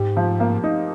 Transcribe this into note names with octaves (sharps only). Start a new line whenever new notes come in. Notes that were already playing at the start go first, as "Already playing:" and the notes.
Already playing: G#2 G4
F3
A#3
D#4